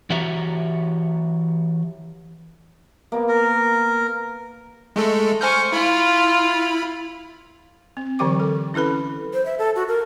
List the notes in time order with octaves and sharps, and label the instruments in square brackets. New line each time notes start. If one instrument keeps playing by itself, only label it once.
[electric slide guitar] E3 F#4 G4 C#5 E5 A#5
[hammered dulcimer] A#3 B3
[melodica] A#4
[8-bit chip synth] G#3 A3 A4
[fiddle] C5 C#6 [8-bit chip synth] G#5 F6 G6
[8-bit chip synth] E4 B5 [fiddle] F4
[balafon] C4
D3 E3 F#3 G4 G5 D6
A4
C#4 E4 A4 B4 B5
[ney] C5
E5
A4
F#4
A#4